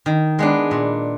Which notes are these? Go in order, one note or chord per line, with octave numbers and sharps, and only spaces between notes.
D#3
G#3 B3 D4
A#2